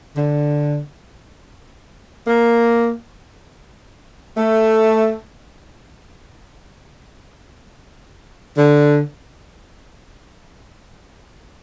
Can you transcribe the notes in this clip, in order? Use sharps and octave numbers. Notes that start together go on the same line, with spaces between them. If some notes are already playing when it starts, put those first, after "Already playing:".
D3
A#3
A3
D3